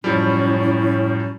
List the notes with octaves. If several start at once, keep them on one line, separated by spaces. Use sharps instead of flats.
F#2 A2 F3 G3 C#4 E4